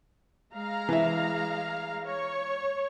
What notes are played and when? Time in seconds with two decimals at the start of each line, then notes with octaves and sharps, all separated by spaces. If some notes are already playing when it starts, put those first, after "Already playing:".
0.55 G#3 F5 A#5
0.89 E3 E5
2.06 C#5